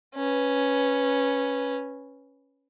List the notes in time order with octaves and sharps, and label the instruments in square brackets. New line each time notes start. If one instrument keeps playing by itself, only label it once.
[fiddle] C#4 B4